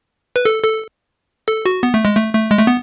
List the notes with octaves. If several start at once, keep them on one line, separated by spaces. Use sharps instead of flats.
B4
A4
A4
A4
F#4
B3
A3
G#3
A3
A3
G#3
A3
B3